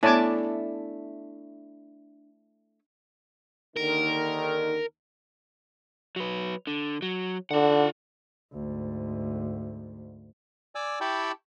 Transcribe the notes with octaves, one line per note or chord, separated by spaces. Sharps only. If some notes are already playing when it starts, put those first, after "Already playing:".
A3 B3 D4 E4 C#5 G#5 A5 D6
D#2 D3 D#3 A#4
F#3 B4
D3
F#3
D3 F4 F#5
D2 G#2
D5 G#5 D6 E6
E4 G4 G5 A5 B5 C#6